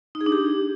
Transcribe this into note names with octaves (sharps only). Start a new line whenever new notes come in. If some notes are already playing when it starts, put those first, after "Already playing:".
D#4
G#4
D4
G4